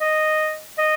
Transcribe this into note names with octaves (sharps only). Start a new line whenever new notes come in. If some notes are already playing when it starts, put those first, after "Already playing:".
D#5
D#5